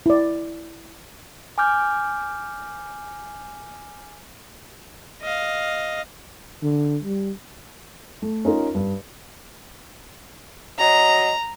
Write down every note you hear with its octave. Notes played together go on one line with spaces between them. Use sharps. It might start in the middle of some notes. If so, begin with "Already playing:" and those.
E4 D5
G#5 D6 F6 G6
D#5 F5
D3
G3
A3
C#4 D#4 F4 A#4
G2
F#3 F#4 D#5 A#5